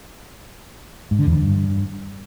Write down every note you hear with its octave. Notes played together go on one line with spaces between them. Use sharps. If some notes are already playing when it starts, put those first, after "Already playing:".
G#2
D3
E2
D3
G2